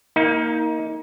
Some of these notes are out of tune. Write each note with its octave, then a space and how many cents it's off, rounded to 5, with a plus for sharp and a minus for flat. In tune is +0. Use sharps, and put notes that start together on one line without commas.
A#3 +0 D#4 +25